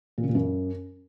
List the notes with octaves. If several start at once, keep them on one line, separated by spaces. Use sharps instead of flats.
A#2
C#3
A#2
F#2